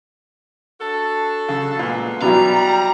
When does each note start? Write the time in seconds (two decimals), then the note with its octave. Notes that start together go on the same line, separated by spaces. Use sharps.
0.79 D4 F#4 A4
1.48 C#3
1.79 A#2 G#3 B3
2.21 B2 F#3 G3 E4 A#5